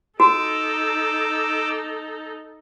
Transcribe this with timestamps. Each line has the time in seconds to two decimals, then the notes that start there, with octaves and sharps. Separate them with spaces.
0.20 D#4 F#4 A4 D6 E6